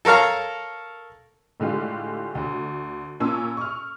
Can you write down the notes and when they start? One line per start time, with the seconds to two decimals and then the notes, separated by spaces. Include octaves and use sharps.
0.05 A4 A#4 C#5 F5 A#5
1.60 A2 D3 G#3 F4 G4
2.35 D2
3.20 A#2 C#4 A5 E6
3.57 C#6 F6